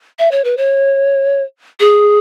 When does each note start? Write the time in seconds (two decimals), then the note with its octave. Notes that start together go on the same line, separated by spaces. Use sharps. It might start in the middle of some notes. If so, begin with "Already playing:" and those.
0.19 E5
0.31 C#5
0.44 B4
0.57 C#5
1.80 G#4